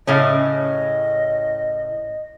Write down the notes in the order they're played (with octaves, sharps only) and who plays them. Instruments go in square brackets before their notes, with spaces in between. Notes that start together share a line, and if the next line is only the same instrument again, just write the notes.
[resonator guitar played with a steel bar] A2 C#3 C#4 [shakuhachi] D#5